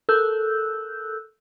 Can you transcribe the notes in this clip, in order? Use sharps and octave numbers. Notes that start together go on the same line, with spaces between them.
A4 A#4 E6 F#6 G6